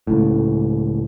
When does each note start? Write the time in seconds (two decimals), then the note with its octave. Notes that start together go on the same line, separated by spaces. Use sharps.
0.07 C#2 A2